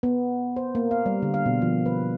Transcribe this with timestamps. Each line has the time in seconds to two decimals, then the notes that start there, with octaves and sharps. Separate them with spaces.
0.03 B3
0.56 C5
0.75 A#3
0.91 F5
1.06 G3
1.22 D3
1.34 F5
1.46 B2
1.62 F3
1.86 B4